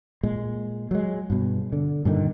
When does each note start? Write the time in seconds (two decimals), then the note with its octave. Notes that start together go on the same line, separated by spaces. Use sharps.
0.23 A#2 G#3
0.91 F#3 G#3
1.30 G2 B2
1.72 D3
2.05 G2 A#2 D3 D#3